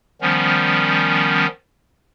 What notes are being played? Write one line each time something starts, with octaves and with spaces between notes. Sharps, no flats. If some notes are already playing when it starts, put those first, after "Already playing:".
D#3 F3 G3 B3 C#4